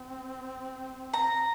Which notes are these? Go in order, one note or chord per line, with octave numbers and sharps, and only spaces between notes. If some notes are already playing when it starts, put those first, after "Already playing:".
Already playing: C4
A#5